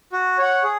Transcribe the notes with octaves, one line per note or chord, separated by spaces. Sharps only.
F#4
C#5 F#5
G#4